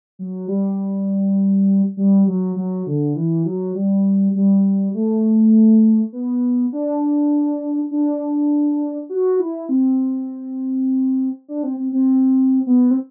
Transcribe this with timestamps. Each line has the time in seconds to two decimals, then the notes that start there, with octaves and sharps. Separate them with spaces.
0.19 F#3
0.48 G3
1.97 G3
2.27 F#3
2.56 F#3
2.87 D3
3.16 E3
3.46 F#3
3.75 G3
4.35 G3
4.94 A3
6.13 B3
6.73 D4
7.91 D4
9.09 F#4
9.39 E4
9.69 C4
11.48 D4
11.63 C4
11.77 C4
11.93 C4
12.66 B3
12.91 C4